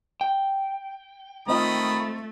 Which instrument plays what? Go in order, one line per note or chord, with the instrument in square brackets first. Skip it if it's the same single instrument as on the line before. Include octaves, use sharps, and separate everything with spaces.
[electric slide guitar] G5
[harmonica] D#3 B5 D#6 [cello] A3 [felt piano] C4 F4 D#5